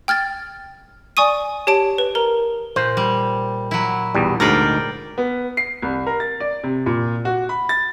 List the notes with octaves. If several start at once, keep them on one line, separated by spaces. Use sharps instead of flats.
G5 F6 G#6 A6
D5 G#5 C#6 D#6 D#7
G4 C#5 A5 D7
B4
A#4 A#5
A#2 C5
G3
F#3 E4
B1 E2 G3
D2 G#2 A#4 D5 G5
B3
C7
C2
A#4
A6
D5
C3
A#2
F#4
B5
A6